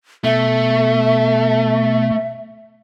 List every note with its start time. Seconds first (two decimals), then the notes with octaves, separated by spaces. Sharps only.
0.24 B2 A3 E5